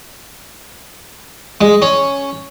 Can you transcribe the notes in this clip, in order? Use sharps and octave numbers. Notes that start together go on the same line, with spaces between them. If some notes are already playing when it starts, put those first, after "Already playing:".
G#3
C#4